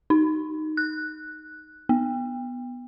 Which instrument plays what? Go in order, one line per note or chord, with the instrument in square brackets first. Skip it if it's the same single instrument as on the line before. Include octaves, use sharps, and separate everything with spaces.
[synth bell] D#4
F#6
B3